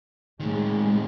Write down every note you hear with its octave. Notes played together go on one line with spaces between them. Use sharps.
A2 D#3 G#3